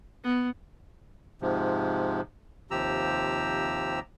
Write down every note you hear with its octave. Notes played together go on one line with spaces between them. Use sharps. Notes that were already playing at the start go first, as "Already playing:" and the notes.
B3
G#2 C3 F3
D#2 C3 F3 G4 A#5 E6